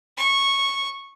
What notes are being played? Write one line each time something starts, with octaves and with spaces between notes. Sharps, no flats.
C#6